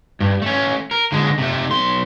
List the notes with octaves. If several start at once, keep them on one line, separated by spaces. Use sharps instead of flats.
G2
A3 C#4
A#4
D3 G#3
C3 A3
B1 C6